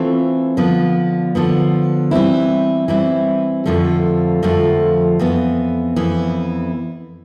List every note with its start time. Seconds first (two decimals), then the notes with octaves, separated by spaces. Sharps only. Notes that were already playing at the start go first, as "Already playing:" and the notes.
Already playing: E3 A3 C4 F4
0.57 D3 F3 B3
1.35 D3 F3 B3
2.11 E3 G3 C4 E4
2.88 E3 G3 C4 E4
3.66 F2 D3 F3 A3
4.43 F2 D3 F3 A3
5.19 F2 E3 B3
5.96 F2 E3 B3